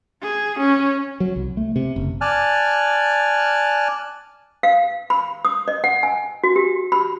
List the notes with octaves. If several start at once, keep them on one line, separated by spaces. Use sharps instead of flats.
G#4
C#4
F#3
C2
A3
C3
F#1
D5 G#5 A5 F6 F#6
F5
B5
D#6
D#5
F#5
G#5
F#4
G4
B5